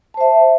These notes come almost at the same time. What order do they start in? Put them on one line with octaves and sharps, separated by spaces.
A5 C5 E5